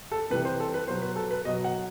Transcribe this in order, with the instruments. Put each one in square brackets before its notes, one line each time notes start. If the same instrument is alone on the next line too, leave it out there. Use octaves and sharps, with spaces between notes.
[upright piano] A4
C3 E3 G3 B4
C5
A4
B4
B2 F#3 C5
B4
A4
B4
B2 F#3 D#5
F#5